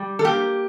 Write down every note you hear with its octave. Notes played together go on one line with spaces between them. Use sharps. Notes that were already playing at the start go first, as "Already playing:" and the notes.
Already playing: G3
A4
A#3 G4